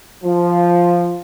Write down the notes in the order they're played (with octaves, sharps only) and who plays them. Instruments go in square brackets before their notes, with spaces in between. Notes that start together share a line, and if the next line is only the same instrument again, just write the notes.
[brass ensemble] F3